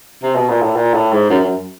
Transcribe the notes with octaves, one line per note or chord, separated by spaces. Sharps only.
C3
B2
A#2
A2
A#2
A2
G#2
F#2
F#2